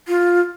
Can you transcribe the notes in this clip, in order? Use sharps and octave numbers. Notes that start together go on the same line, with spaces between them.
F4